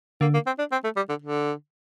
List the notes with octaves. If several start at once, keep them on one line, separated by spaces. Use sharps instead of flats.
D3 A#3
A#3
C4
D4
C4
A3
G3
D3
D3